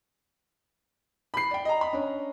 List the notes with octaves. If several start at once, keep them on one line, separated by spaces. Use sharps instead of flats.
B5 C7
D5 G5
D#5 A#5
B5
C#4 D4